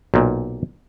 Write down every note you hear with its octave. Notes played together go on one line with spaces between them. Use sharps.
B1 A#2